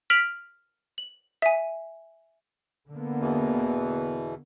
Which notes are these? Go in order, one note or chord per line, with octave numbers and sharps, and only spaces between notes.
F6 B6 D7 F7 F#7
F#7
E5 G#5
D3 A#3 B3
E2 B2 E3